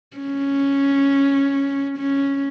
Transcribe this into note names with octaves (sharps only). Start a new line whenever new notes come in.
C#4
C#4